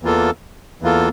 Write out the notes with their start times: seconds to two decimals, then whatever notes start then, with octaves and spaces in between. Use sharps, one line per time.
0.02 E2 E3 A#3 F4 A4
0.81 E2 E3 A#3 F4 A4